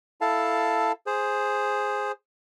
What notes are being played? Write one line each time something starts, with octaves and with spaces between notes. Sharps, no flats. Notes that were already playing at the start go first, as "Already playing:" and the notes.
E4 A4 F5 A5
G#4 C5